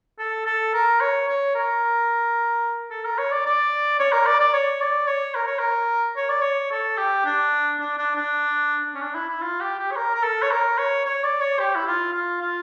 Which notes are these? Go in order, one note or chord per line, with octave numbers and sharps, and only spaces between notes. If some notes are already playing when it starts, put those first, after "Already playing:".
A4
A4
A#4
C#5
C#5
A#4
A4
A#4
C#5
D5
D5
C#5
A#4
D5
D5
C#5
D5
C#5
A#4
C#5
A#4
C#5
D5
C#5
A4
G4
D4
D4
D4
D4
C#4
D4
E4
E4
F4
G4
G4
C#5
A#4
A#4
A4
C#5
A#4
C#5
C#5
D5
C#5
G4
E4
F4
F4
F4